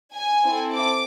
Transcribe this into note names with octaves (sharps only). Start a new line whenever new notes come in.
G#5
C4 E4 A4
D6